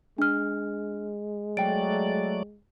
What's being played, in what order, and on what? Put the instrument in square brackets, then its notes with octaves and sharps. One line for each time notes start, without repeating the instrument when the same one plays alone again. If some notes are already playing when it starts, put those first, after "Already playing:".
[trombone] G#3 [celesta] D4 F6
[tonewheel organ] F#3 A3 D5 [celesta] G5 D7